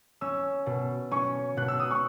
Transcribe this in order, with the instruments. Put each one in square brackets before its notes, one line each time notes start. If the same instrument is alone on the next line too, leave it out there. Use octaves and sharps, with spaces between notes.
[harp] C#4 [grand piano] E6
[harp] B2
[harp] C#4 [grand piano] C#6
[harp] B2 [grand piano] F#6
[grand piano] E6
D#6
C#6